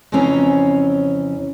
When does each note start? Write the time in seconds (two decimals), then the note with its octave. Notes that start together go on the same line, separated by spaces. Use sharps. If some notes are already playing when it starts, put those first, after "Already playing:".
0.12 F2 C#3 E3 C4 C#4 A#5